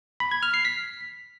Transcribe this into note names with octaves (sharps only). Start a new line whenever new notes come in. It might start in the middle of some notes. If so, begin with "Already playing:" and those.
B5
G#6
F6
C7
B6